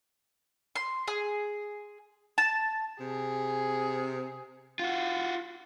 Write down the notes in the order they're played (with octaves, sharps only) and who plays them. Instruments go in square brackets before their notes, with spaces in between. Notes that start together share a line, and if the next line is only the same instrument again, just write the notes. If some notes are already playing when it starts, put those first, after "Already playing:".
[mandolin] C6
G#4
A5
[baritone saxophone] C3 [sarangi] G#4
[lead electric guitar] F4 F#4